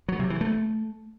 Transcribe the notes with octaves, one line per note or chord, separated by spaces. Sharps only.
F#3
C3
E3
A3